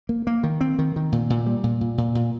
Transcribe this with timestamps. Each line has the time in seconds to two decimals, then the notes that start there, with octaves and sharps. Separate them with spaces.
0.09 A#3
0.27 A#3
0.43 D#3
0.61 C4
0.79 D#3
0.96 D#3
1.12 A#2
1.30 A#2
1.46 G3
1.64 A#2
1.81 A#2
1.98 A#2
2.15 A#2